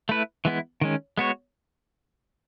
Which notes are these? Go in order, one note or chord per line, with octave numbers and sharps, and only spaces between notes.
A3 E4 B4
E3 G#3 B3 E4
D#3 G#3 C#4
G#3 B3 F#4 C#5